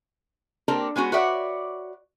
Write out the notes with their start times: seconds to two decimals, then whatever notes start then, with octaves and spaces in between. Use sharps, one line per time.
0.68 A#3 C4 D4 G4 A4 A#4
0.96 G#3 B3 C#4 F#4
1.12 F#4 B4 C#5 D5 E5 F#5